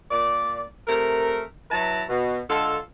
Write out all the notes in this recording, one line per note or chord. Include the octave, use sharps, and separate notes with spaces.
A#2 D5
C3 A3 A#4
F#3 E4 B4 A5 A#5
B2
D3 G#3 F4 A4